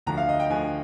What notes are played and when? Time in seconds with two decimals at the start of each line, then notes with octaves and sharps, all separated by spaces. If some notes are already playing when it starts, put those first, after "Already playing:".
0.07 D2 D3 F3 A#5
0.17 F5
0.29 D#5
0.40 G5
0.50 D2 D3 F3 G#5